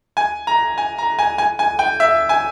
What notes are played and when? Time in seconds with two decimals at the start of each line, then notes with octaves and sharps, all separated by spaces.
0.17 G#5
0.47 A#5
0.78 G#5
0.98 A#5
1.19 G#5
1.38 G#5
1.59 G#5
1.79 G5
2.00 E5
2.29 G#5